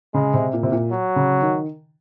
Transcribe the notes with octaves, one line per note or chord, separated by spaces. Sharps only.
C#3 G#3
C3
A#2
C3
A#2
F#3
C#3
D#3